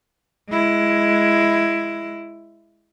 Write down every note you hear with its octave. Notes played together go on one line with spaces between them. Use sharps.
G#3 E4